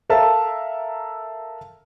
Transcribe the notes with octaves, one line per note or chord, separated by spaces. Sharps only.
A4 A#4 E5 F5 A5